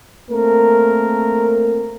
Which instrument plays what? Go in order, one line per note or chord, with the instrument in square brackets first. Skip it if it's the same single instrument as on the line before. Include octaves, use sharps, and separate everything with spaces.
[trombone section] A3 A#3 C4 A#4